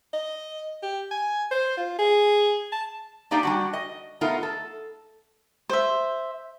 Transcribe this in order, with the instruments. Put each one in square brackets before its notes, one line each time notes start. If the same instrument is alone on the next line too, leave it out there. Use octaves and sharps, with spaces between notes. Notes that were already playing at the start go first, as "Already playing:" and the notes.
[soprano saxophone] D#5
G4
G#5
C5
F4
G#4
A5
[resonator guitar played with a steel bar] A#3 D4 D#4 G4 D5 F5
G3 D4 F#4
D#5
A3 B3 D#4 F4 A#4
A4
[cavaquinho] C5 E5